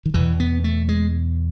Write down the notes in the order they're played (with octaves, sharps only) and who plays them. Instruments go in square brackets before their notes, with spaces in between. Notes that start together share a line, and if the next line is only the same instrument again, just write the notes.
[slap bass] D#3
E2 B2 E3
B3
A3
G#3